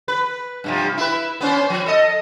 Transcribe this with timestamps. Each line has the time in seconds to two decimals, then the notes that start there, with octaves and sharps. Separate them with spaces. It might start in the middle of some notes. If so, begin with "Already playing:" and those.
0.08 B4
0.64 G2 C3 F3
0.97 E4 B4
1.41 B3 C#4 C5
1.70 F3
1.86 A4 D#5